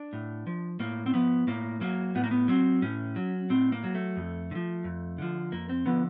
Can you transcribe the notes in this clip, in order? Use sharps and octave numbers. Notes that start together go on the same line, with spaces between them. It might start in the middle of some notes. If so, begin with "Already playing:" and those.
Already playing: D4
A2
F3
A2 A#3
C4
F3 B3
A2 A#3
F#3 A#3
A2 B3
A#3
B3
F#3 C4
A2 C#4
F#3
A2 C4
A#3
F#3
A3
F2
D3
F3
F2
D3 F3
F2 A#3
C4
D3 F3 B3